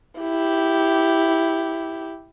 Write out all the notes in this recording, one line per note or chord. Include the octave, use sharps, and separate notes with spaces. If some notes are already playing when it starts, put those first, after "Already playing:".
E4 G4